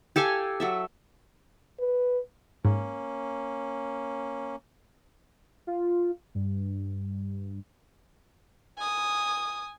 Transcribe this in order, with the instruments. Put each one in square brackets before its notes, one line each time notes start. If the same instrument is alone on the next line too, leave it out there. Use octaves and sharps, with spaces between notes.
[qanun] G4 A4 F5 G#5
F#3 A4 E5
[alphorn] B4
[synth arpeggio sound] G#2 [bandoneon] A#3 C#4
[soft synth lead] F4
G2
[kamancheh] G#5 D#6